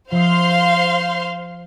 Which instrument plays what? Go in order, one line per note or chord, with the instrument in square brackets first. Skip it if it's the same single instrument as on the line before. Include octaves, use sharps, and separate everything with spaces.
[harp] F3 E5 D#6 [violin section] C5 F5 C6